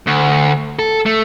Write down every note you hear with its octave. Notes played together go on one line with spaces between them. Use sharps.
D2
A4
A3